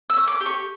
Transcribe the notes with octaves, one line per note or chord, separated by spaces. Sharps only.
E6
C#4
D6
G4
C#6